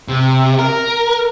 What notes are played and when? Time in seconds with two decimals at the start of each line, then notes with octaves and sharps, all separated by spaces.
0.09 C3
0.58 A#4